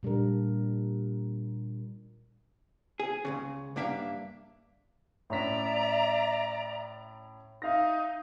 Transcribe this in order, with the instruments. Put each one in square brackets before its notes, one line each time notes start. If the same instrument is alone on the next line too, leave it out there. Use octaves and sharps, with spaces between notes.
[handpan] A#2 G3 D4 A#4
[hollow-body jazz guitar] G#4
C#2 G2 C#3
G2 A#3 D4 E5 F5
[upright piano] A2 C#4 B6 [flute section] D5 E5 A#5
[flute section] D#4 [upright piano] E5 F5 A#6